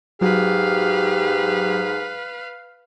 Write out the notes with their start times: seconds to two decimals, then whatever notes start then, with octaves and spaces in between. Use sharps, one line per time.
0.21 G#2 F#3 F#4 G4 B4 F5